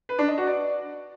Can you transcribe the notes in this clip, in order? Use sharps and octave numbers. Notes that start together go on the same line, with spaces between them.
B4
D4
D#5
F#4
D5